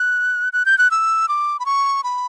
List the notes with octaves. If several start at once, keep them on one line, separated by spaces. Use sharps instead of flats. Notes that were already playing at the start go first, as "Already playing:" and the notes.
Already playing: F#6
F#6
G6
F#6
E6
D6
B5
C#6
B5